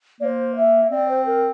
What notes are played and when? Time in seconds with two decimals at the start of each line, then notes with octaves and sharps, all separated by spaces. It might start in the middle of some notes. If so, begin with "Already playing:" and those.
0.20 A#3 C5 D5
0.56 E5
0.91 C4 D5
1.09 C5
1.26 A#4